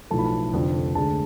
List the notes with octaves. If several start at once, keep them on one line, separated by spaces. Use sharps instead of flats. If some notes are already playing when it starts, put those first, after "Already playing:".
B1 A2 F3 A3 A5
B5
A5
F1 F2 D3 F3
D2 D3 G#3 A5